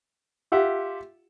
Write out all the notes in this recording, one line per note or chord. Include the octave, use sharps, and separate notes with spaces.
F4 G4 E5 F#5